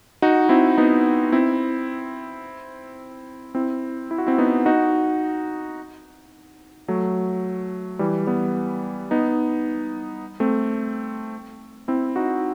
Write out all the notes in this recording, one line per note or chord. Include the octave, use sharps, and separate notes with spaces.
D#4 F#4
C4 E4
B3 D#4
C4 E4
C4 E4
E4
F#4
C4 E4
B3 D#4
D#4 F#4
F#3 A3
E3 G3
G3 B3
B3 D#4
A3 C4
C4 E4
D#4 F#4